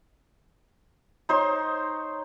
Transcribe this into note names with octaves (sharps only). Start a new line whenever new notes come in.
D#4 C5 C#5 C6